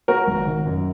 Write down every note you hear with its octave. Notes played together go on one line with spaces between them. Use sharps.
A#3 F#4 A#4
G#1
D#3
F#2